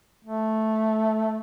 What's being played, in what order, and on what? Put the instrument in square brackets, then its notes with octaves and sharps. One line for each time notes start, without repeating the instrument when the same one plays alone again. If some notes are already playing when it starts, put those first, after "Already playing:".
[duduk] A3